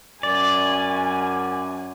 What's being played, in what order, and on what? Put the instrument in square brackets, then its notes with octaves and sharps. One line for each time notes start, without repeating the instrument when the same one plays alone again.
[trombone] F#2 [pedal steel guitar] D5 [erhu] G#5